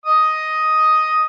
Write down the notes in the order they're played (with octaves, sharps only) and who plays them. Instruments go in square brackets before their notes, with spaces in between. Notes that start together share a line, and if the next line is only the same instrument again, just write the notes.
[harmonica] D#5 D#6